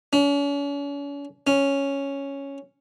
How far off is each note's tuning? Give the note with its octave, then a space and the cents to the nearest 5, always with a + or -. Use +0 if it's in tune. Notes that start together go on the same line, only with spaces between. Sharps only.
C#4 +40
C#4 +0